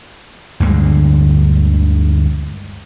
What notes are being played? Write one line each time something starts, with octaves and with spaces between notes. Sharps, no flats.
D2 G2 D3 G#3